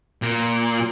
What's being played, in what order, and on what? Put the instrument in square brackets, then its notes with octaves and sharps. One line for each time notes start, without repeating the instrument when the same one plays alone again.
[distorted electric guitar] A#2